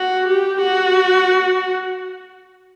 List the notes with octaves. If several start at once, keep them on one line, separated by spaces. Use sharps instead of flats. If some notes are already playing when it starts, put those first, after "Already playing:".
Already playing: F#4
G4
F#4